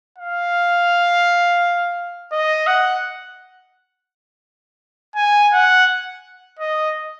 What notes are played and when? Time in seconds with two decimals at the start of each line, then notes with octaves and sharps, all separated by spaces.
0.18 F5
2.32 D#5
2.67 F#5
5.16 G#5
5.53 F#5
6.59 D#5